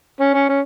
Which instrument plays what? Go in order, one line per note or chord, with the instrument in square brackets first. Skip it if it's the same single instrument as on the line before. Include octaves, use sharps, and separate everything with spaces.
[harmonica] C#4
C#4
C#4